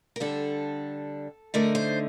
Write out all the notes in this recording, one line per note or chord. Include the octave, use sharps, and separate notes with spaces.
A#4
D3 G3 D4 A4
D3 A3 D#4 A#4
C5